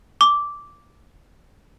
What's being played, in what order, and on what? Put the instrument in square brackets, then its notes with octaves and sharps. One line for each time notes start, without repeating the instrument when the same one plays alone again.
[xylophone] D6